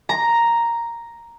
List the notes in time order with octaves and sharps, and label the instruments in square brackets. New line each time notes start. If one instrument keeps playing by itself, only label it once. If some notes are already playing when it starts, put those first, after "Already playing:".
[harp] A#5